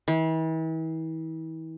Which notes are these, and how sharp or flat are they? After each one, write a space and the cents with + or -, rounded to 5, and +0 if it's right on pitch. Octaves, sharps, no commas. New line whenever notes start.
E3 -40